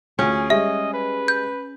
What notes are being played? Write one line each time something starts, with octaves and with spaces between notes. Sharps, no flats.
D2 C#4 F4 G#4
G3 G#3 D#5 E5
B4
G6